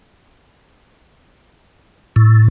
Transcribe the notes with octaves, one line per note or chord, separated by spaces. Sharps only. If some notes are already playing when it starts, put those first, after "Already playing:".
A2